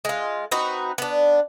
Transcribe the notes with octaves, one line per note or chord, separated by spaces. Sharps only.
G#3 F4
C4 D#4 F#4 B4
B3 D4